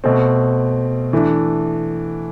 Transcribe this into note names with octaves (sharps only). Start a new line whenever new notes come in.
B2 A3 C4
E3 A3 D4